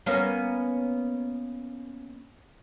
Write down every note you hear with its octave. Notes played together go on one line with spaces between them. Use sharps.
A#3 B3 C#4